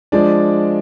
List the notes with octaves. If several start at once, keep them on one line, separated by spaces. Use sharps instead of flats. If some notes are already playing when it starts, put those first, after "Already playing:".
F3 G#3 D4 D5